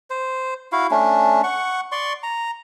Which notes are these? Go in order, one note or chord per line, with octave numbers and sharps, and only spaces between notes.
C5
E4 F#4 F5
A3 C#4 D4
F#5 C#6
D5 C6 C#6
A#5